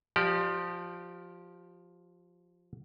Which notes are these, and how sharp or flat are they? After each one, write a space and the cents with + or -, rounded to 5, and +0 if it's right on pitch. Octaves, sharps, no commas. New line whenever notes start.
F3 +5 G4 -15 D5 +30